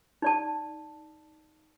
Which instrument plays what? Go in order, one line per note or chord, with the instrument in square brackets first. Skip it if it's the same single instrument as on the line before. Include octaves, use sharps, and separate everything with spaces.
[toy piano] D#4 D5 A5